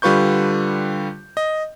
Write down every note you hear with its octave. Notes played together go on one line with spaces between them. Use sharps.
D3 G3 F4 B4 C#6 G6
D#5